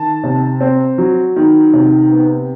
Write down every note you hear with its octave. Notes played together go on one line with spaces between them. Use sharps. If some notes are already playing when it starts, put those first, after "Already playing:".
Already playing: D#3 A5
C3
C4
F#3
D#3
C3
B3